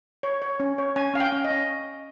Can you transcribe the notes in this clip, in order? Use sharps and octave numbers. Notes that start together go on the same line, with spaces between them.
C#5
C#5
C#4
C#5
C#4 G#5
C#4 F5
G5
C#4
D#5
C#4